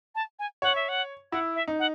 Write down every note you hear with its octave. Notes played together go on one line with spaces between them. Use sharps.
A5
G#5
C#5 F#5
E5
F#5
E4 F#5
E5
D#4
F#5